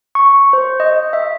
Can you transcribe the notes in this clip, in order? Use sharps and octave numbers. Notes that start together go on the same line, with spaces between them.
C#6
C5
D#5
E5